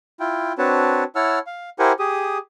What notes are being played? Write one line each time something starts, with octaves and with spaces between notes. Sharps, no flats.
E4 F4 G5
C4 D4 F#4 B4 C#5 A5
E4 C#5 F#5 A5 E6 F6
F5
E4 G4 A#4 C5 F#5 G#5
G4 G#4 D#6